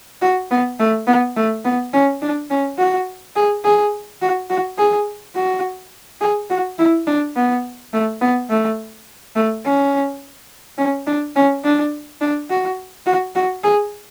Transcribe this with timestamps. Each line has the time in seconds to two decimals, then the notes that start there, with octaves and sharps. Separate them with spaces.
0.22 F#4
0.51 B3
0.79 A3
1.07 B3
1.36 A3
1.64 B3
1.93 C#4
2.22 D4
2.50 C#4
2.78 F#4
3.36 G#4
3.64 G#4
4.21 F#4
4.50 F#4
4.78 G#4
5.35 F#4
6.21 G#4
6.50 F#4
6.78 E4
7.07 D4
7.36 B3
7.93 A3
8.21 B3
8.50 A3
9.35 A3
9.64 C#4
10.78 C#4
11.07 D4
11.36 C#4
11.64 D4
12.21 D4
12.50 F#4
13.06 F#4
13.36 F#4
13.63 G#4